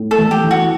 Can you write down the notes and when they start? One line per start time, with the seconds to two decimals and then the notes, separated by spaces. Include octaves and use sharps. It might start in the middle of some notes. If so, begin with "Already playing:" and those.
Already playing: A2
0.11 A4
0.18 A1
0.31 G4
0.44 E3
0.51 F#4